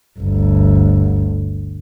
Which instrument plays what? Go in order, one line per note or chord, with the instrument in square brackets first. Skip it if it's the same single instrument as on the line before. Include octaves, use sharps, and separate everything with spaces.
[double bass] G1 D2